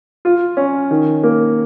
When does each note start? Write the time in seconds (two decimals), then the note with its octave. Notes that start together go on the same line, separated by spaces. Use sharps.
0.25 F4
0.57 C#4
0.91 D#3
1.23 A#3